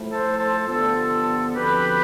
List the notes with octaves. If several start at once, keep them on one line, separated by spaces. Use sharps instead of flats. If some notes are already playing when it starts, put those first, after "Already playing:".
Already playing: A2 F3 A3
A4 C5
A4 C5
G2 D3 F3 B3 F4 A4
D2 D3 F3 C4 G4 B4